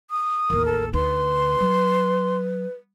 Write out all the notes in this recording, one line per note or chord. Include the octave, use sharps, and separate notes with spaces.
D#6
A1 D#2 A#4
A4
D2 D#4 B4 C6
F#3